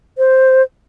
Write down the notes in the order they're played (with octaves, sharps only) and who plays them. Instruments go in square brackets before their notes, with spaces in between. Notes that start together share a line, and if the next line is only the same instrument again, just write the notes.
[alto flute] C5